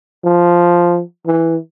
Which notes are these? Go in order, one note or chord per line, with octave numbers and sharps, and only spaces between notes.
F3
E3